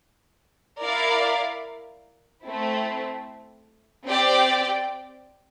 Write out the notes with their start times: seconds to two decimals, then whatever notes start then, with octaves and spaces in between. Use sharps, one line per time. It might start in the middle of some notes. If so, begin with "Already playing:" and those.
0.81 E4 A#4 D5 F5
2.44 A3 C4 E4
4.07 C4 G4 D5 G5